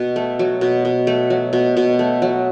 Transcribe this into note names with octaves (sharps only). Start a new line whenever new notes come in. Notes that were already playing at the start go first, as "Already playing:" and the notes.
Already playing: B2
A3
F#3
B2
B2
A3
F#3
B2
B2
A3
F#3